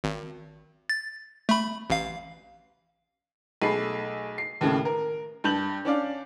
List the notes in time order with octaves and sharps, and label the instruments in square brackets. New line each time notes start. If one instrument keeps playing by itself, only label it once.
[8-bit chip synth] G#1
A6
A3 B5
A1 F5
[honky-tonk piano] B1 A3 G#4 A4 B5 C7
C7
D#2 A2 C#3 A5
A#4
G2 A5 G6 F#7
C#4 D4 D5 F5